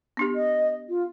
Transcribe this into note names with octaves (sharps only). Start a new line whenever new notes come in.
B3 D4 G4
D#5
F4